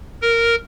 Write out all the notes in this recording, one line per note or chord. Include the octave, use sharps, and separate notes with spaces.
A#4